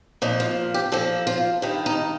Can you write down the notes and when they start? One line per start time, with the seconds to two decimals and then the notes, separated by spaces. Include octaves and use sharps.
0.22 A#2 F3 D#4
0.40 F4
0.74 G4
0.92 A#2 F3 A4
1.27 F4
1.62 G2 D#3
1.86 D#4